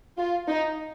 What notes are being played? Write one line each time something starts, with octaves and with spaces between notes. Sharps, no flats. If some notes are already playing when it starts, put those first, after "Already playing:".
F4
D#4